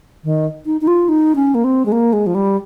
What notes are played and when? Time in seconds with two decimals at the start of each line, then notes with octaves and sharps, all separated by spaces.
0.24 D#3
0.66 D#4
0.81 D#4
0.87 F4
1.09 D#4
1.36 C#4
1.55 A#3
1.64 C4
1.86 G#3
1.92 A#3
2.13 G#3
2.27 F3
2.35 G3